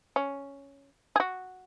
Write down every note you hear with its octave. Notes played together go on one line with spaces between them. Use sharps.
C#4
G#4
F#4